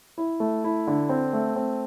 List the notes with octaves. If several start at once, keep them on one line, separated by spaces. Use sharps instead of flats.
E4
A3
E4
D3
C4
A3
C4